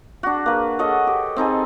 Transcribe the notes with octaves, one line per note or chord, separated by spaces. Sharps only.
D4 F#4
A#3 B4
A4 C#5 D#5 F#5
G4
C4 D#4 A4 G#5